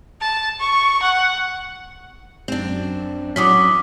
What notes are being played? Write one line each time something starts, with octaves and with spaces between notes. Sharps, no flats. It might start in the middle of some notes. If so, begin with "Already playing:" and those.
A5
C#6
F#5
F#2 C4 D4
E3 F#3 C#4 D6 D#6 B6